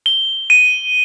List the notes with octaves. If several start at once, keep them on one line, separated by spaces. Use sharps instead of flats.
G7
D#7